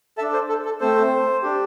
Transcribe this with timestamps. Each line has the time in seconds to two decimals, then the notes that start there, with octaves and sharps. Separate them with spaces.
0.18 A4 E5 A5
0.22 D4
0.33 C5
0.49 A4
0.65 A4
0.81 A3 C4 A4 C5
1.43 D4 G4